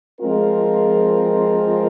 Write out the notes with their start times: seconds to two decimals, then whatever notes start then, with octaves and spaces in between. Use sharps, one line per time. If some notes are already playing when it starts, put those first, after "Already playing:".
0.21 F3 G#3 C4 F4 A#4